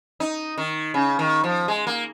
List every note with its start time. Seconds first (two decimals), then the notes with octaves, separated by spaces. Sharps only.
0.20 D#4
0.58 D#3
0.94 C#3
1.19 D#3
1.44 F3
1.68 G#3
1.87 A#3